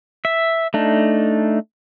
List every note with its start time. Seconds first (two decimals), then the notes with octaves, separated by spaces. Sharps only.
0.25 E5
0.74 A3 D4 D#4